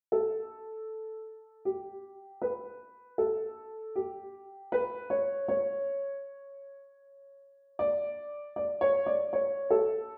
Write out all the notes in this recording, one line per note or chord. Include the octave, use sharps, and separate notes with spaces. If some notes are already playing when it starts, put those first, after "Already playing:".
A4
G4
B4
A4
G4
B4
C#5
C#5
D5
D5
C#5
D5
C#5
A4